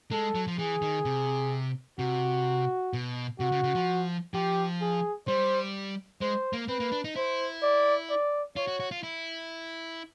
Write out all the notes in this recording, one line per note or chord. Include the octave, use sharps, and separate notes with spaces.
G#3 A4
F#3
F3
E3 G#4
D#3
C3
C3 F#4
B2
C3 F#4
C#3
C#3
F3
F3 G4
G#4
G3 C5
G#3 C5
A#3
C4 B4
A#3
D4
D#4
E4 C5
D5
D5
F4 C#5
F#4
F#4
F4
E4